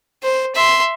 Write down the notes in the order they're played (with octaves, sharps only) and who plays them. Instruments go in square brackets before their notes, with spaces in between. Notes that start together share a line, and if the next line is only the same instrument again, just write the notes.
[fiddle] C5
E5 C6